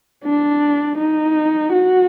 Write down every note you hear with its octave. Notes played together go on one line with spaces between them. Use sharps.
D4
D#4
F#4